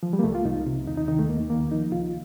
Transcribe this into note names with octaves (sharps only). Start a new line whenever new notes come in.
F3
G3
A#3
C2 A3
F4
C2 D#4
C3
D#2 D#4
D#4
D#3 D#4
A3
D#2 A#3
D#3 A#3
F3 D#4
C2 F4